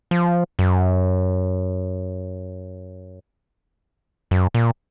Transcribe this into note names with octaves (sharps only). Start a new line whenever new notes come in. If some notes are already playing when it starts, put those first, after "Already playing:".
F3
F#2
F#2
A#2